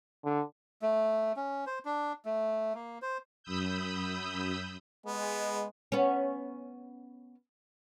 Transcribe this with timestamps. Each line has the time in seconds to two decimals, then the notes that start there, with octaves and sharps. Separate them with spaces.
0.25 D3
0.82 A3
1.36 C#4
1.67 C5
1.85 D4
2.25 A3
2.75 A#3
3.02 C5
3.43 F#2 B5 D#6 E6 G6
5.06 G#3 B3
5.92 B3 C#4